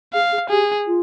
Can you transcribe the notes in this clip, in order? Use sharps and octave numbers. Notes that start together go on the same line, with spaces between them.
G#4 F5
G#4
G4 G#4
F4